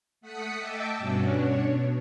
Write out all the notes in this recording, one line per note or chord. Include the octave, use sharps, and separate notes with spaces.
A3 F#5 D#6 B6 C#7
D#5 E5 G5 A5 D6 E6
G2 B2 C#4 D4 F#4
D4 C#5
B2